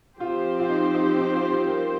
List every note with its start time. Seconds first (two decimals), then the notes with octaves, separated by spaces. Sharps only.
0.20 F3 C4 F4 G4 C5
0.59 F4
0.69 D#4
0.94 D#4
1.19 D#4
1.35 F4
1.51 F4
1.67 A#4